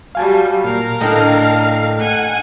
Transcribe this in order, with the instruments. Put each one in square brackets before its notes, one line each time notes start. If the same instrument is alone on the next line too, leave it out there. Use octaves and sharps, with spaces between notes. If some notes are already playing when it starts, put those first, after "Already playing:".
[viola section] F#3 G3 [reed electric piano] F5 G#5 A5
[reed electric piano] A#2 [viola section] A#4 F5 A#5
[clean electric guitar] A2 [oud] D3 D4 [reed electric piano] A4 D#5 G5
[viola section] F#5 G#5